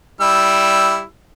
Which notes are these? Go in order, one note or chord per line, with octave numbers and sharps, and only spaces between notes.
G3 E4 E6